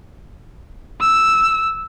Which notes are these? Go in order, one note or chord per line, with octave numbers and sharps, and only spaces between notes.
E6